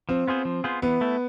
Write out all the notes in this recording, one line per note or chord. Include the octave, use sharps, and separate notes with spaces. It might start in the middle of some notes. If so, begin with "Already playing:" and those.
F3 C4
B3 F4 G#4 C5
F3
B3 F4 G#4 C5
E3 B3
A3 E4